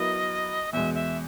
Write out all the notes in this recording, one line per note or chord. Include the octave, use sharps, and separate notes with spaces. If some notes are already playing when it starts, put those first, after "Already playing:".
Already playing: F#3 B3 E4 A#4 D#5
E2 B2 G#3 E5
E5